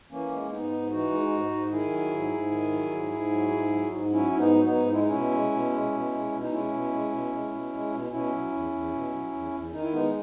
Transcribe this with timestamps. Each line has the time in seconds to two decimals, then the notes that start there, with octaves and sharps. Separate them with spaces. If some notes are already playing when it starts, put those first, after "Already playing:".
0.11 E3 A#3 C#4
0.31 G#3
0.51 G#2 B3 D#4
0.71 G#2
0.90 E3 D#4 F#4
1.11 G#3
1.31 G#2
1.51 G#2
1.71 D#3 E4 G#4
1.91 F#3
2.12 G#2
2.32 G#2
2.51 D#3
2.71 F#3
2.92 G#2
3.11 G#2
3.32 F#3
3.51 G#2
3.72 F#3
3.91 G#2
4.11 F#3 C#4 E4
4.31 G#2 E4
4.38 B3 D#4
4.51 F#3
4.65 B3 D#4
4.72 G#2
4.91 G#3 E4
5.00 D#4
5.08 B2 C#4 E4
5.31 G#3
5.52 B2
5.72 G#3
5.92 B2
6.12 G#3
6.32 B2
6.41 D#4
6.51 G#3 C#4 E4
6.72 B2
6.92 G#3
7.11 B2
7.31 G#3
7.52 B2
7.73 G#3
7.92 B2
8.12 B2 C#4 E4
8.32 F#3
8.52 E2
8.72 E2
8.92 B2
9.12 F#3
9.32 E2
9.52 E2
9.72 D#3 D#4
9.83 E4
9.92 G#3 B3 D#4